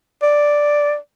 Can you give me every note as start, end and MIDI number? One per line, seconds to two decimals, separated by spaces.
0.22 0.97 74